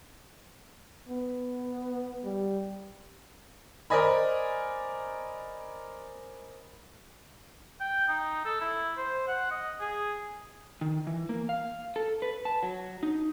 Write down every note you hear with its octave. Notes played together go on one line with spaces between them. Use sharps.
B3
G3
A#4 C5 D5 D#5 G#5 B5
G5
D#4
A4
E4
C5
F#5
D#5
G#4
D#3
E3
A#3
F5
A4
B4
A5
F#3
D#4